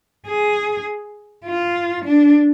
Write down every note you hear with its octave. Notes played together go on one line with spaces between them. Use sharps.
G#4
F4
D4